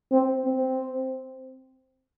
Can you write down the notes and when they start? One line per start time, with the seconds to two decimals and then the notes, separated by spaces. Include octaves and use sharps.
0.11 C4
0.45 C4